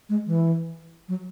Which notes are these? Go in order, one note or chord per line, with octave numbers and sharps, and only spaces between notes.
G#3
E3
F#3